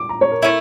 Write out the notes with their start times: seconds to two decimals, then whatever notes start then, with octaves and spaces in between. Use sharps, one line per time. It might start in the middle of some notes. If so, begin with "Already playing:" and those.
Already playing: D6
0.09 A#5
0.21 C#5
0.32 A#4
0.42 A3 C#4 E4